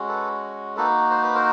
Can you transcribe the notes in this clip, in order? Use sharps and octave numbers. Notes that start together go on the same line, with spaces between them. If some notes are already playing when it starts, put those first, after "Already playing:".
Already playing: G#3 C#4 F#4
A4 B4
A#3 D#4 F#4 A4 B4
C5
B4
A#4 C5